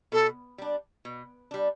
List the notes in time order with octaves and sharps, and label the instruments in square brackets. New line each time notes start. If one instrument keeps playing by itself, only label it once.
[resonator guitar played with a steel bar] B2 [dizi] A4
[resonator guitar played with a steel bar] G3 D4
B2
G3 D4